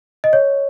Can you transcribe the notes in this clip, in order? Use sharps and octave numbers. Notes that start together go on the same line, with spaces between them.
D#5
C#5